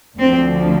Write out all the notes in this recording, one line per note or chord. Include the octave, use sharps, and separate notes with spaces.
D2 D3 F3 C4